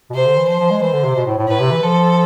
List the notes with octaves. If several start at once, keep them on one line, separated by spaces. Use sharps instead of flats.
B2
C3 C5
D3
E3
F3 C5
F3
G#3
E3 C5
D3
C3
B2
A2
A2
A2 B4
C3
E3
F3 A4